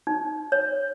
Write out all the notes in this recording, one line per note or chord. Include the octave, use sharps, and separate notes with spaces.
D#4
C#5